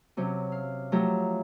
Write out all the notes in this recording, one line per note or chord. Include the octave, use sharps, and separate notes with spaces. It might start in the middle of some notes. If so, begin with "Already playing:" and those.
C3 F#3 C#4
F5
F3 F#3 A3 G4 E5 A#5